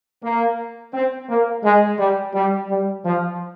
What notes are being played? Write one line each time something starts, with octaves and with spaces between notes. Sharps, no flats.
A#3
C4
A#3
G#3
G3
G3
G3
F3